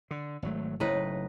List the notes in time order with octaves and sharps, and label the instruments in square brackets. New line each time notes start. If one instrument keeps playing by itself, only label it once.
[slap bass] D3
G#1 F#3 A3
[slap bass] F#1 [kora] A2 D#4 B4